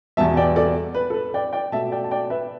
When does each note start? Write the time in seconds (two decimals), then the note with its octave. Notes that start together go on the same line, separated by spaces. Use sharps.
0.17 E2 B2 G3 B3 E5 A5
0.37 D5 G5
0.56 A4 D5
0.95 B4
1.10 A4
1.14 B4
1.34 D5 G5
1.53 D5 G5
1.72 B2 A3 E5 A5
1.91 D5 G5
2.04 A5
2.11 D5 G5
2.30 B4 E5